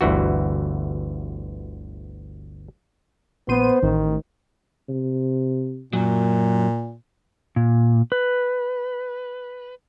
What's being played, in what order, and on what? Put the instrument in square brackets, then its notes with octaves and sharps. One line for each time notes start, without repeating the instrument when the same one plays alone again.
[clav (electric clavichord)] G1 D2 E3 F#4
[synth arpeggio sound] A#1 C6 D#7 [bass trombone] B3 [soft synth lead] C5
[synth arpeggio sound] A1 [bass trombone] D#3
[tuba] C3
[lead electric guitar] F#2 F#3 [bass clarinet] A#2 [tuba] A#3
[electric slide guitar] A#2
B4